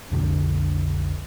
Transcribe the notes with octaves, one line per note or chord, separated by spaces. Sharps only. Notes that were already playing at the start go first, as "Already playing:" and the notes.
B1 F2 D3